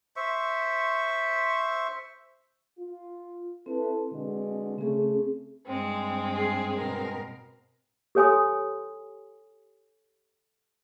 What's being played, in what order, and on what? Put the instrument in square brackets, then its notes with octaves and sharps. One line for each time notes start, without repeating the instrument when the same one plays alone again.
[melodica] C5 E5 C#6
[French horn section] F4
[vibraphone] C4 [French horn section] E4 A4 B4
[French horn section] B2 D3 G#3
[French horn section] C#3 A3 [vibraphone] C4 G#4
[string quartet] G2 G#3 C4
[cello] G#4
B2 A#4
[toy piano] G4 A4 C#5 G#5 C6 D#6